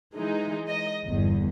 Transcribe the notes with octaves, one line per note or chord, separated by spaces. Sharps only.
E3 G#3 D#4
D#5
G1 E2